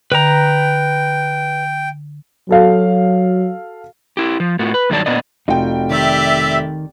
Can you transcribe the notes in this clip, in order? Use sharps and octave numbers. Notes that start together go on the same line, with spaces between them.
D3 B4 G5 A#5
F#3 F#4 A4 F5
E4 G4
F3
A2 F4 F#4
B4
G2 D#3 F#3 A3 D5 A5
A#2 B3 D4 D5 D#5
F1 D#4 F4 F#4 G5
D#3 G4 D5 E5